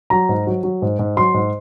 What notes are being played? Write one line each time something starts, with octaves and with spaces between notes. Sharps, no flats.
F#3 A#5
G#2
F#3
F#3
G#2
G#2
F#3 C6
G#2